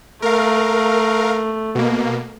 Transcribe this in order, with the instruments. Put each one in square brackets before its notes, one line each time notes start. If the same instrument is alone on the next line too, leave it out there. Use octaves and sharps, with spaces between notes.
[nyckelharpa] A3 [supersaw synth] A#4 F5
[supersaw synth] B2 A#3